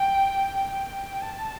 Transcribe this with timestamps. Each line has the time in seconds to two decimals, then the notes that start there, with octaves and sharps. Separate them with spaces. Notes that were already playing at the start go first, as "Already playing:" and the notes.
Already playing: G5
0.70 G5
1.21 A5